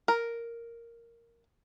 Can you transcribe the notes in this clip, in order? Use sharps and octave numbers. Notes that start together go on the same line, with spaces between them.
A#4